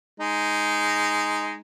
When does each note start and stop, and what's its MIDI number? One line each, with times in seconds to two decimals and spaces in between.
0.20 1.60 56
0.20 1.60 63